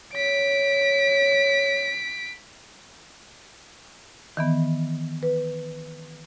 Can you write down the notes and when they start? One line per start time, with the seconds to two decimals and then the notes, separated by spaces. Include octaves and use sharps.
0.15 C#5 B6 D7
4.37 D#3 E3 B3
5.23 B4